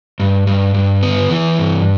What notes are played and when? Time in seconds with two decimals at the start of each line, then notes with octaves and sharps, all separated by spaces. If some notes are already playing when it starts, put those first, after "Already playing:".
0.20 G2
0.47 G2
0.74 G2
1.03 B3
1.30 E3
1.58 G2